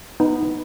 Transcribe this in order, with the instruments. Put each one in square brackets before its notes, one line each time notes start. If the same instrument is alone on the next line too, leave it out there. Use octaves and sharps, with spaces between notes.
[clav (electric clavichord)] B3 [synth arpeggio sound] D#4